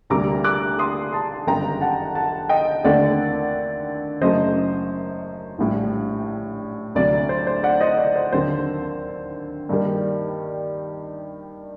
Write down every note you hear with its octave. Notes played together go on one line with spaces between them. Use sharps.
D2 C3 G3 A#3 A#5 D6
D6 F#6
C6 D#6
A5 C6
G1 F#2 D#3 G3 G5 A#5
F#5 A5
F#5 A5
D#5 G5
D#2 D3 A3 C4 D5 F#5
F#1 F#2 F#3 A3 C5 D#5
A#1 A2 G3
D2 C3 F#3 D5
C5
C5
D5 F#5
C5 D#5
D5
C5
D#2 D3 F#3 C4 C5
G2 D#3 G3 A#3